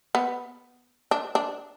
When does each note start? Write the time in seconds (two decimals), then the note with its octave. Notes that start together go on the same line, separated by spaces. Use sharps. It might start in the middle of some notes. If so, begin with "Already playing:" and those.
0.15 B3
1.11 D4
1.35 D4